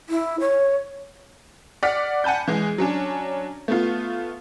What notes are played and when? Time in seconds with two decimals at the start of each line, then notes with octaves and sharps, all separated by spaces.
0.09 E4
0.40 C#5
1.83 D5 F#5 F6 B6
2.24 F#5 G#5 A5 B5 G6
2.48 E3 G#3 G#4
2.78 F#3 C#4 D4
3.68 A3 B3 F4